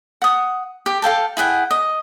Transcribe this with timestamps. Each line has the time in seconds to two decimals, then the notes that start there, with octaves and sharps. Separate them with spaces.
0.22 F#5 D#6
0.86 G4
1.02 A4 F5 G5 A5
1.37 E4 G#4 F#5 G5
1.71 D#5